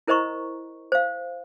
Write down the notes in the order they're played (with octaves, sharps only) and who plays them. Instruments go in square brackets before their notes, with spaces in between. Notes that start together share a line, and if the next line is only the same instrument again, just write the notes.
[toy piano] E4 A#4 C5 D#5 A#5 C#6
C5 F5